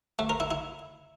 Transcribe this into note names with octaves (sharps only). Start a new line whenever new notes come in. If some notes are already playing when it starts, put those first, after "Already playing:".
A3
A#4
E4
E4